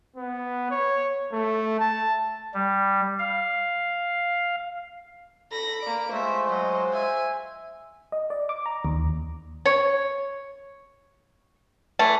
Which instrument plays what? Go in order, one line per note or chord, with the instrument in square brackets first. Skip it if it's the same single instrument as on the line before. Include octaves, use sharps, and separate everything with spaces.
[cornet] B3
C#5
A3
A5
[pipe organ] G3
F5
[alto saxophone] A4 [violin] B5 A#6
[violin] A#3 D7 [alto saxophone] D5
[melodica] G#3 F4 [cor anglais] A3 [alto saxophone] C5 [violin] E5
[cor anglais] F#3 [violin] D#5
[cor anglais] E5 [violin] G#5
[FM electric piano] D#5
D5
D6
A#5
D#2
[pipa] C#5
E3 A3